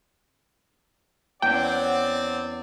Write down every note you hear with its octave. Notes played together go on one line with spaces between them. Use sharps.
E2 C4 C#4 D5 F#5 G5